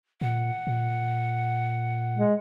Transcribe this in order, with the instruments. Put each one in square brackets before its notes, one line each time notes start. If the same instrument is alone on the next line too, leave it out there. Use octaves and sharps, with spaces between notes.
[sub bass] A#2 [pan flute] F#5
[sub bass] A#2
[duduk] G#3